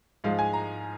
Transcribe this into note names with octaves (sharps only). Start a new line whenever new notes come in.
G#2 F3 G#3 F5
G#5
A#5